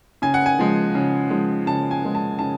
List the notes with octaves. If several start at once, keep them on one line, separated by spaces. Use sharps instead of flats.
C#3 G#5
F#5
G#5
F3 G#3
C#3
F3 G#3
C#3 A5
G#5
F3 G#3
A5
C#3 A5